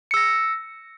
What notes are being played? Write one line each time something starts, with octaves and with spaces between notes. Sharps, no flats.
E6 A#6 C#7